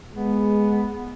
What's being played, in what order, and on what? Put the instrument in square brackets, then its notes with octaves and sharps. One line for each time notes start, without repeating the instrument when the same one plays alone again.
[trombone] G#3 [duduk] B3